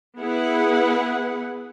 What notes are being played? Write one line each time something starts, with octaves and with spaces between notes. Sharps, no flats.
B3 E4 G#4 B4 F#5